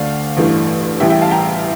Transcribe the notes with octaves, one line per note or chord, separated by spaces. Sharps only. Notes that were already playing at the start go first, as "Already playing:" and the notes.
Already playing: D2 D3 A3 D5 F5
A1 G2 E3 A3
A1 A2 G3 E5 G5
E5 G5
F5 A5
G5 A#5